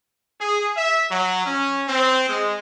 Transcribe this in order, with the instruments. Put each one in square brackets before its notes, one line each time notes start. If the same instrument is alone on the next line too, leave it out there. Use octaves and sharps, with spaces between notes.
[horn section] G#4
E5
F#3
C#4
C4
G#3